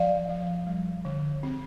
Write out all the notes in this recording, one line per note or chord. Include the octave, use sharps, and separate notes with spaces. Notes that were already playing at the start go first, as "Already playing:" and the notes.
Already playing: F3 D5 F5
F3
G3
D3
C4